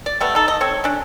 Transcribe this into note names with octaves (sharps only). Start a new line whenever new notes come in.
D5
G3 A3 B3
D#4 A4
D#5
C4 A4 C#5
C#4 D4